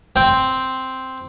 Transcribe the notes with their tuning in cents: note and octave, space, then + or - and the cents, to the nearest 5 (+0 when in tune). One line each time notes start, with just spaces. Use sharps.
C4 +0 G5 +0